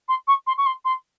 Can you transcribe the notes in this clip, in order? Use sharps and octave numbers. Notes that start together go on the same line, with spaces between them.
C6
C#6
C6
C#6
C6
C6